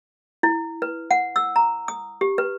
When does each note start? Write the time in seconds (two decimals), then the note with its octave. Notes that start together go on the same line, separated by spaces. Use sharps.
0.43 E4
0.82 B4
1.11 F#5
1.36 E6
1.56 A#5
1.88 D#6
2.21 G4
2.38 B4